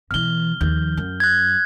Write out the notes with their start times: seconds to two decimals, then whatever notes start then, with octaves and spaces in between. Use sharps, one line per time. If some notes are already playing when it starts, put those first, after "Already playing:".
0.11 B2 E3 F6 G7
0.61 D#2 F3 G6
0.97 F#2
1.20 F#6 G#6